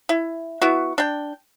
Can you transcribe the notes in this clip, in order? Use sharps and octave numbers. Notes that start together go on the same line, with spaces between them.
E4
B3 E4 F#4
D4 G5